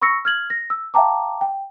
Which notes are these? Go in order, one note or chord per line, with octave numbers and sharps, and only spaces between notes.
B5 C#6 E6 A#6 C#7
F6 G#6 F#7
A#6
E6
E5 F5 G5 A5 A#5 D6
G5